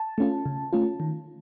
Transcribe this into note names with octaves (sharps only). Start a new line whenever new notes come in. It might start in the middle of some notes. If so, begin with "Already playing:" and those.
Already playing: A5
A3 C#4 F4
C#3
A3 C#4 F4
D#3